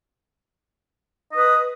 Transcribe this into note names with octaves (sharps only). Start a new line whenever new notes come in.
B4 D#5 D#6